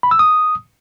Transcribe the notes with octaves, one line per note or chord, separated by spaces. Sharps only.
B5
E6
D#6